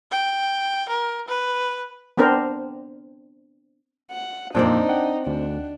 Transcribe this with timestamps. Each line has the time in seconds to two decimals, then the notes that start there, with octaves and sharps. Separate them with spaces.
0.11 G5
0.89 A#4
1.28 B4
2.17 B3 C4 D4 A#4 C5
4.11 F#5
4.55 F2 A#2 A#3 C4 D4 D#4 C5 D5
4.89 F#5 G5
5.27 D2 D4